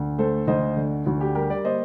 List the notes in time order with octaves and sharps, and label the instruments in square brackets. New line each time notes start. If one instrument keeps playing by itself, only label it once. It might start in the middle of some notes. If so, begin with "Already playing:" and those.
Already playing: [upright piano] D2
A3 A4 C5
D2 C5 D#5
D3
D2 F#4
G4
G3 G4 A#4
A#4 D5
A#3 C5 D#5